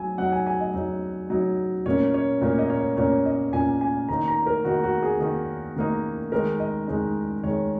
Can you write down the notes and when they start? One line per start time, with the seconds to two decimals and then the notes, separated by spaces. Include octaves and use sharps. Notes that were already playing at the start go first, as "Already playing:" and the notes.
Already playing: F#3 D#4 G#5
0.18 F#3 D#4 F#5
0.32 G#5
0.47 G#5
0.61 D#5
0.74 F#3 D#4
1.30 F#3 D#4
1.86 A#2 A#3 C#4 C#5
2.14 C#5
2.41 A#2 A#3 C#4
2.58 D#5
2.70 C#5
2.97 A#2 A#3 C#4 C#5
3.25 D#5
3.53 A#2 A#3 C#4 G#5
3.81 G#5
4.09 D#3 A#3 D#4 A#5
4.28 A#5
4.46 A#4
4.64 D#3 A#3 D#4 F#4
4.83 F#4
5.02 G#4
5.20 D#3 A#3 D#4
5.76 D#3 A#3 D#4
6.32 D#3 G#3 D#4 A#4
6.60 D#5
6.88 D#3 G#3 D#4
7.43 D#3 G#3 D#4 C#5